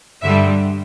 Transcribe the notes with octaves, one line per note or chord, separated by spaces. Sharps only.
G2 D3 G3 E5